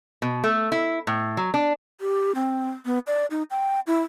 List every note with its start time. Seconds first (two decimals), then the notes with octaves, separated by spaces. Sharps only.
0.22 B2
0.44 A3
0.72 E4
1.07 A2
1.37 F#3
1.54 D4
2.01 G4
2.35 C4
2.85 B3
3.07 D5
3.31 D#4
3.51 G5
3.87 E4